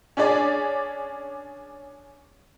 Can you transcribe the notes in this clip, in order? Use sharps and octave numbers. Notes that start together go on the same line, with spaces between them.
C#4 D4 G#4 D5